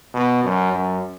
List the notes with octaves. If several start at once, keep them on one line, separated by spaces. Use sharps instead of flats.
B2
F#2
F#2